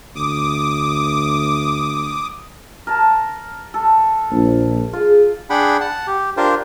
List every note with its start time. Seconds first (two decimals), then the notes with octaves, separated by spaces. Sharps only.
0.16 D2 D6 D#6
2.87 A#4 A5
3.74 A4
4.32 A#1
4.93 F4 G#4
5.50 D4 G#4 F#5 G5 B5
5.81 F#5 A5
6.07 G4
6.37 D4 F4 G4 A#4 C5